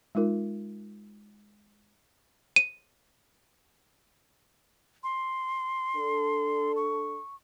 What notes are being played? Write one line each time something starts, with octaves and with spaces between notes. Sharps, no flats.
G#3 D#4 F4 A#4
D#7
C6
D4 A4
C#6